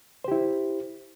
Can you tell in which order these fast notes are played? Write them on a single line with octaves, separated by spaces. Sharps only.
C5 G4 E4